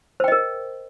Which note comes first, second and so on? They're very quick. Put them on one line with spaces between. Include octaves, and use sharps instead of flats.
C5 G5 D#5 A#4